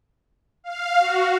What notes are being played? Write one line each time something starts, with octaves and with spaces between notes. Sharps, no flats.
F5
F#4